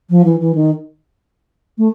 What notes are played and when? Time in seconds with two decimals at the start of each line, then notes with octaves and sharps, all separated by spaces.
0.10 F3
0.25 E3
0.40 E3
0.55 D#3
1.78 A3